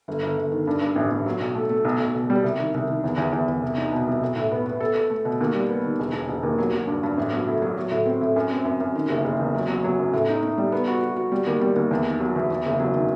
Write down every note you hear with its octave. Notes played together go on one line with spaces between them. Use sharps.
G1
G1
G1
D#3
G2
G2
A1
A1
F#3
B1
A3
A3
B1
B1
B2
G3
C2
D#3
C2
D#3
E2
E2
E2
E2
C2
D#4
B2
C2
B1
A2
B3
B3
A4
A4
A3
B2
D#2
G3
B3
D#3
E1
E1
E1
D#2
F#3
F#3
G2
G2
A1
F#3
A2
F#3
F#3
A2
C4
A2
F#2
C4
F#2
F#2
D#3
F#1
F#1
E2
F#3
F#3
F#3
F#2
A2
D#4
D#4
G3
B3
F#4
F#4
F#4
G3
D#2
G3
D#2
E2
D#3
F#3
E2
E2
F#1
F#3
D#3